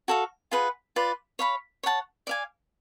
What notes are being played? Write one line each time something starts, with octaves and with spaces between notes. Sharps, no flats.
F#4 A4 F5
F4 G#4 B4 F#5
F4 B4 D5
C#5 F5 B5
C#5 F#5 A5
D5 F5 G#5